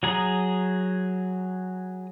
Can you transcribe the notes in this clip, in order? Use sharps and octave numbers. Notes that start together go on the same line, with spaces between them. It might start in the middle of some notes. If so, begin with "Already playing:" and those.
F#3 G#4 A#5 D#6